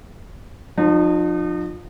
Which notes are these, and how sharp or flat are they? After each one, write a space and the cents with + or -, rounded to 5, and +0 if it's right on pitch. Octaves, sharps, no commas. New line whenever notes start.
F3 +25 D#4 -35